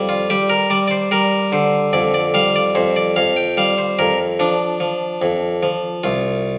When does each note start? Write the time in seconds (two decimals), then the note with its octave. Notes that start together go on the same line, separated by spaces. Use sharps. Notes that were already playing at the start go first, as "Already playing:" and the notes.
Already playing: F2 G3
0.09 F4
0.30 G3 G4
0.50 A#4
0.70 G3 D5
0.88 D5
0.91 C5
1.11 G3 A#4
1.52 D3 C5
1.93 F2 D5
2.14 D5
2.34 G3 F5
2.56 D5
2.75 F2 C5
2.96 D5
3.16 F2 F5
3.36 G5
3.57 G3 F5
3.78 C5
3.99 F2 A#4
4.39 F3 D4
4.80 F3
5.22 F2
5.63 F3
6.04 C2 F4